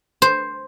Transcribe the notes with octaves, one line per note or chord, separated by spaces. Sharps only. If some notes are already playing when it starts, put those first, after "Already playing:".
C5